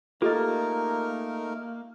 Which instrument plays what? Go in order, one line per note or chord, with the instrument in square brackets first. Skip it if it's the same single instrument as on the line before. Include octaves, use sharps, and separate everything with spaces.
[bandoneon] A3 D#4 A#4 [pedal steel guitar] A#3 [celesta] F4 G4 [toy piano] A4 D#5